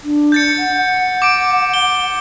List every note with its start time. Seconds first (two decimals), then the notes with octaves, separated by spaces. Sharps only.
0.03 D4
0.32 G6 A6 C#7
0.58 F#5
0.77 F#5
1.22 D6 D7
1.74 G7